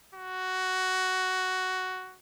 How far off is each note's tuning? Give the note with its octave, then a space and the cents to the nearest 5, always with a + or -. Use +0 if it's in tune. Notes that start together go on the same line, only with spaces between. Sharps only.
F#4 +10